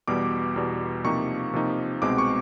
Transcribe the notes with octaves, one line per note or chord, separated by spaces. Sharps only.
E2 B2 G3 D6
E2 B2 G3
C3 F3 A#3 D#4 C#6
C3 F3 A#3 D#4
C2 B2 G#3 C4 D6
C#6